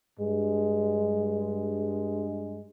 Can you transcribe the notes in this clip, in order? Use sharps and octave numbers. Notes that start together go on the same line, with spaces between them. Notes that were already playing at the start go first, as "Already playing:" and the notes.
G2 G#3